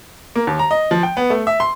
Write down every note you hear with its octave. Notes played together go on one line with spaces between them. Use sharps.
A#3
D#2
A#5
D#5
F3
G5
B3
A3
E5
C6